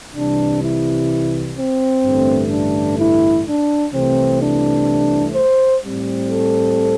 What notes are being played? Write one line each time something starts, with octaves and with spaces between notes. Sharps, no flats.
C2 C3 E3 G3 D4
E4
C4
A1 G2 D3 A3
D4
E4
D4
C2 C3 E3 A3 C4
D4
C5
A2 G3 C4
A4